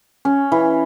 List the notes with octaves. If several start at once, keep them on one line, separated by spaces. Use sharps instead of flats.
C#4
E3